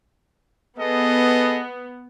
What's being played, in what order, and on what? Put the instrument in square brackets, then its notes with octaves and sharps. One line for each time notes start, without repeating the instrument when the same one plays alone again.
[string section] B3 [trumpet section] G#4 A4 D#5